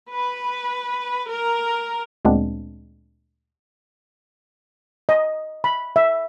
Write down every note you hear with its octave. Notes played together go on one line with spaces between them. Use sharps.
B4
A#4
D2 A#2 G#3 B3 C4 D4
D#5
B5
E5